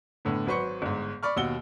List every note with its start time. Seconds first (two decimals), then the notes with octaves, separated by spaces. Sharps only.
0.25 A2 D3 B3
0.47 G#1 F#3 B4 C5 C#6 C#7
0.82 G1 G#2
1.23 D5 B5 C#6 F6
1.36 D#2 B2 F#5 E6 G7